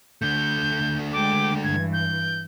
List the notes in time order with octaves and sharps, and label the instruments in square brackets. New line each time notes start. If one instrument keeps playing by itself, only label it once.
[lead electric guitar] D3 A3 [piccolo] G6
[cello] G#3 G5 [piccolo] D6
[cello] G2 E3 [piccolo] G#6
[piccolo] G6